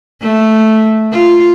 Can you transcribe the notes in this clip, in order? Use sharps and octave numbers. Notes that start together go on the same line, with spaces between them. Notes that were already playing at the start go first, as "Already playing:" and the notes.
A3
F4